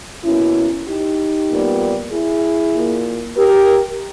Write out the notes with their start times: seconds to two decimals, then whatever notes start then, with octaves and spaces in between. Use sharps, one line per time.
0.25 B2 A#3 C#4 E4
0.88 D#4 G4
1.50 A#2 G3 B3
2.12 E4 G#4
2.75 A#2 A#3
3.37 G4 A#4